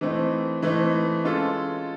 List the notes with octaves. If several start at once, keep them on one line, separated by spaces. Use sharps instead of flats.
E3 A3 C4 D#4
E3 A3 C4 D#4
G#3 C#4 F4 A4